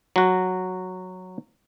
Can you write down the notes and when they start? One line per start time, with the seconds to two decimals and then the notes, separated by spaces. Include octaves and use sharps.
0.16 F#3 F#4